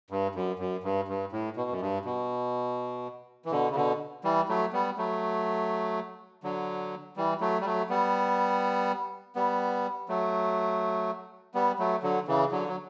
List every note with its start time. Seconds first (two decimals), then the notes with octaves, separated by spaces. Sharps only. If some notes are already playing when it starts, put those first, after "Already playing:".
0.11 G2
0.35 F#2
0.59 F#2
0.84 G2
1.08 G2
1.32 A2
1.56 B2
1.70 F#2
1.81 G2
2.05 B2
3.46 E3
3.52 B2 D3
3.70 C#3
3.75 B2 D3
4.24 E3 G3
4.49 F#3 A3
4.73 G3 B3
4.97 F#3 A3
6.44 D3 F#3
7.17 E3 G3
7.41 F#3 A3
7.61 G3
7.66 F#3 A3
7.90 G3 B3
9.36 G3 B3
10.09 F#3 A3
11.54 G3 B3
11.79 F#3 A3
12.03 D3 F#3
12.28 C#3 E3
12.52 D3 F#3
12.68 F#3